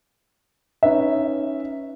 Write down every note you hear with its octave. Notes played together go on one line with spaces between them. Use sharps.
C#4 D#4 B4 E5